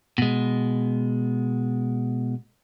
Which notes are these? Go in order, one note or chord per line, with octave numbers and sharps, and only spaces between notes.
B2 G#3